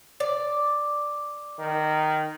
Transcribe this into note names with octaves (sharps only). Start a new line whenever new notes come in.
D5
D#3